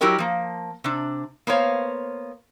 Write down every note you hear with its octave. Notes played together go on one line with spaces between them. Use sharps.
F#3 E4 F#4 G4 A#4 D#5
F3 A#3
C3 D4
A#3 B3 C5 C#5 F5